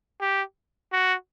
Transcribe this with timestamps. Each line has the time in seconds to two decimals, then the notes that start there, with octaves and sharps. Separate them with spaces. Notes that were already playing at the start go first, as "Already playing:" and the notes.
0.20 G4
0.93 F#4